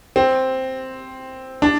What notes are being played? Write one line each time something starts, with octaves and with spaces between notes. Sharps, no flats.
C4
D4